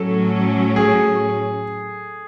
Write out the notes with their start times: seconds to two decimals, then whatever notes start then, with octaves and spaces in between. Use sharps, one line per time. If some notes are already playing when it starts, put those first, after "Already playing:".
Already playing: A2 F#3 C#4 A4
0.76 G#4